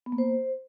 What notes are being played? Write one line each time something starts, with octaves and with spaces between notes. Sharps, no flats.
B3
A#3
C5